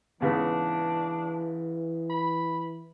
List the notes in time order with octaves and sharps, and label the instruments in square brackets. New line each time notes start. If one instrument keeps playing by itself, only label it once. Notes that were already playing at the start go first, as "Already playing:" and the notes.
[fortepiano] G#2 C#3 B3 [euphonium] E3 [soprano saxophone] D4
[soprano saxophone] B5